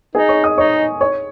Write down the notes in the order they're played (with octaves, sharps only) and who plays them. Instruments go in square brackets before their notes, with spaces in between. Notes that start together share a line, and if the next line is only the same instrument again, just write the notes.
[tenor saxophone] D#4 [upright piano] G#4 G#5
[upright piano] C#5 C#6
D#5 D#6
[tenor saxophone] D#4 [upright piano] C#5 C#6
[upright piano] C#5 C#6